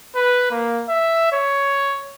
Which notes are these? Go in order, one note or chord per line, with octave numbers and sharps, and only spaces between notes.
B4
A#3
E5
C#5